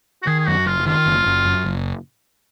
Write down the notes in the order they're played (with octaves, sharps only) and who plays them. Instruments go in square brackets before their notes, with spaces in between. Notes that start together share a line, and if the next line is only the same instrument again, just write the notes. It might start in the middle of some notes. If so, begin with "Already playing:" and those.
[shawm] F#4
[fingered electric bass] D#3 [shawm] G#4
[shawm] G#4
[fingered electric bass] F#2 [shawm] F#4
[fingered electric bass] F#1 [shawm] F4
[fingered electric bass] D#3 [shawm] F4
[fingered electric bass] F#1
F#1
F#2
F#1